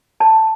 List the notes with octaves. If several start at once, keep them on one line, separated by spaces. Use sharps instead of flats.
A5